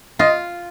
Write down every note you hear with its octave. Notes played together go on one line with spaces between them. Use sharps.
F4 D#5